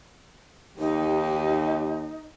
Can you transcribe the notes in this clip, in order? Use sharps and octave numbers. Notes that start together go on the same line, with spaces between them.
D#2 D#4 G4